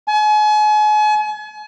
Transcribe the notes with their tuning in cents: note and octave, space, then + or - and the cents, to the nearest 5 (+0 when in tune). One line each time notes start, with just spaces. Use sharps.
G#5 +40